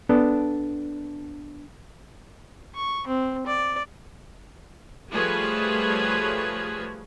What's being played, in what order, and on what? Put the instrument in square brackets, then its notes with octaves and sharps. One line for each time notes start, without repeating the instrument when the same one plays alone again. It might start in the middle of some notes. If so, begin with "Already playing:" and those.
[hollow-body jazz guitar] B3 D4 A4
[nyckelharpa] C#6
C4
D5
[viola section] F3 G3 A3 G#4 B4 C#5